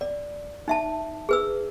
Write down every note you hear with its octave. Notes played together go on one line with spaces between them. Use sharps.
D5
D#4 E5 A5
G#4 B4 E6